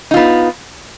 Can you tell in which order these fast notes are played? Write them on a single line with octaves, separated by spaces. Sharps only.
D#4 F4 B3